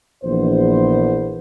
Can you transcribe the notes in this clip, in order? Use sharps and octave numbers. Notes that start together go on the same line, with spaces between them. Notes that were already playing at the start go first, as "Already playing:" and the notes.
A#1 E3 B3 C5